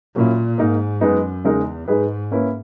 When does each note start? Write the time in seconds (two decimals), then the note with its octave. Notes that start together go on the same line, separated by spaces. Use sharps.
0.16 A#2 F#3 A#3 C#4 E4
0.58 G#2 A#3 D#4 A#4
1.01 F#2 G#3 B3 D#4
1.44 E2 C#3 G#3 D#4 A#4
1.88 G#2 G#3 D#4 G#4 B4
2.31 A#3 C#4 E4 B4